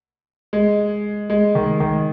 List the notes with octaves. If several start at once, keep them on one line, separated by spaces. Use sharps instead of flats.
G#3
G#3
D#3
D#3